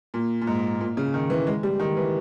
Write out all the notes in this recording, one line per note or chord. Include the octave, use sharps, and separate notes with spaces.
A#2
A#2
G#2
A#2
C#3
D#3
E3
G#3
G3
D#3
E3